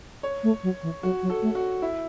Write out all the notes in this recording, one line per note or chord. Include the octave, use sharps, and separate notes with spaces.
C#5
A3
F#3
E3
F#3 F#4
F#3
A4
A3
F#4
E4